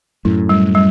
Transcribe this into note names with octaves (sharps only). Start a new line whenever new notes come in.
F#2 A2 E4
G3
G3